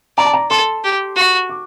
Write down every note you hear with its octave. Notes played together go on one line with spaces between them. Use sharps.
D5 A#5
A5
A#5
A4 C6
G4
F#4
D6